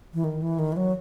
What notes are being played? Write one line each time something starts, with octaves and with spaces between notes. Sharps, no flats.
E3
D#3
E3
D#3
E3
F#3